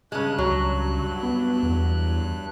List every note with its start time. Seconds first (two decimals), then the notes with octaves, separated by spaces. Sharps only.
0.12 G2 C#3 G#3 F#6
0.38 C#2 F#3
1.23 B3
1.63 E2